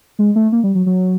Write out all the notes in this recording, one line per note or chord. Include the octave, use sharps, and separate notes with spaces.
G#3
A3
A#3
G3
F#3
F#3